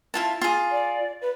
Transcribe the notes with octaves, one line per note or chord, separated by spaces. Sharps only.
E4 F4 A5
F4 G#4
D5
B4